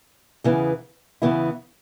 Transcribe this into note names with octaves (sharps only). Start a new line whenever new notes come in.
E2 C#3 E3 B3 E4
E2 C#3 E3 B3 E4